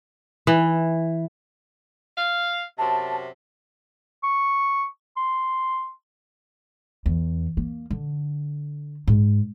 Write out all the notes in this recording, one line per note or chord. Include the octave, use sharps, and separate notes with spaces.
E3
F5
F#2 C3 A5
C#6
C6
E2
A#3
D3
G#2